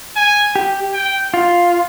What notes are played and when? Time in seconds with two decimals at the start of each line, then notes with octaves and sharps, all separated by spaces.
0.16 G#5
0.55 G4
0.94 G5
1.34 F4